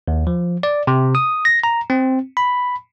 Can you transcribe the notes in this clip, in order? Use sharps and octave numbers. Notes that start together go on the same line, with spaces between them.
D#2
F3
D5
C3
D#6
A#6
A#5
C4
B5